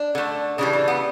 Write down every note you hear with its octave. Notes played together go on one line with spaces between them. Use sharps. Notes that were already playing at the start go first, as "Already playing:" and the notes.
Already playing: D4
D3 A3
C#3 E3 G3 D4
D4
B3